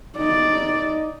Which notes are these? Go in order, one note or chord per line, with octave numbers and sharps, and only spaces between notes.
D#4 D5